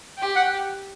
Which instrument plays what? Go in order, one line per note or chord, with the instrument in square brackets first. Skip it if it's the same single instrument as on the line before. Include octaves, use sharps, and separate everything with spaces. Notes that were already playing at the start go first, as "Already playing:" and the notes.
[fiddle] G4
[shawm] F#5